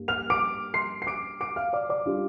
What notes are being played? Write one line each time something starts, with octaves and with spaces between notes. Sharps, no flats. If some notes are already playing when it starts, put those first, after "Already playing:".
Already playing: G2 G3 A#3
F6 F7
D6 D7
C6 C7
C7
D6 D7
D6 D7
F5 F6
D5 D6
D5 D6
G3 D4 F4